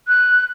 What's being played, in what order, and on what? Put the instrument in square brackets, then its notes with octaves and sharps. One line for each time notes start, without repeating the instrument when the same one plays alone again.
[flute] F#6